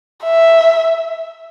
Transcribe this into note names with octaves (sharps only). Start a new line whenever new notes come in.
E5